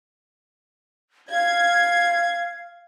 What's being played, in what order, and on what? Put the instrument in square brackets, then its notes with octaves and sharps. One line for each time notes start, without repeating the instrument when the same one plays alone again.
[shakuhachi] F5 [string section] G#6